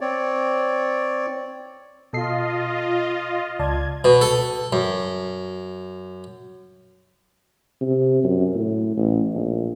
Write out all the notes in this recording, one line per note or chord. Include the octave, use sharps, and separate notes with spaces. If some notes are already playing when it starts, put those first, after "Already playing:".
C4 C#5 D5
B2 F4 A4 D#5 C7
C#2 D5 A5 G#6
B2
A4
F#2
C3
F#2
A2
A1
A#1